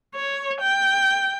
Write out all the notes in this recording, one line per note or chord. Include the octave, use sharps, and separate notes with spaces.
C#5
G5